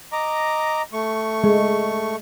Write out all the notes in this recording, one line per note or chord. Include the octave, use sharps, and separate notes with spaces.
D#5 A#5 D6
A3 C#6
G#3